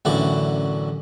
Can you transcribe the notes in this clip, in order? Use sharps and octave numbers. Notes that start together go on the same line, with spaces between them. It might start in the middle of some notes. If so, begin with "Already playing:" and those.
A1 F#2 D3 E3 F#4 D5